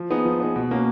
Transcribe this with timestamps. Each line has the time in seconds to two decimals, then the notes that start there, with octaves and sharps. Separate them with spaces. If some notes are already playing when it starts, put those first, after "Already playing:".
Already playing: F3
0.10 B3 D#4 G#4
0.25 F3
0.40 B3 D#4 G#4
0.56 B2
0.71 A#3 C#4 F#4